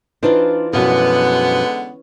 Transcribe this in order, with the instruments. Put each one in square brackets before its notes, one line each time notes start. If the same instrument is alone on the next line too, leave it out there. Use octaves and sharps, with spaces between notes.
[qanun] E3 F4 D5 [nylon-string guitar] D4 D#4 C5
[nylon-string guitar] F#2 B2 F3 [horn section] D3 G#3 B3 [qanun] C#4 D5